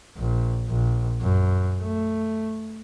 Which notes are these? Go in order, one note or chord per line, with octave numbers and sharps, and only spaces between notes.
A#1
A#1
F#2
A3